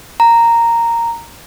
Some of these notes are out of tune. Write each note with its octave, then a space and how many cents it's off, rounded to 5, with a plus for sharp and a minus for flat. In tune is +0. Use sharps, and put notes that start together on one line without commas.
A#5 -10